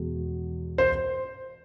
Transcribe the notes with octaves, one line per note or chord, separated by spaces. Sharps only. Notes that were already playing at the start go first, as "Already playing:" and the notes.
Already playing: E2 B2 G#3
C5